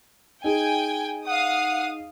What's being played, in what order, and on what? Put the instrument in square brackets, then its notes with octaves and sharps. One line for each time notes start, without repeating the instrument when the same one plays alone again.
[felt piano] D#4 G#4 [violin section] G5 G#5
[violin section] F5 D#6 [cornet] F#5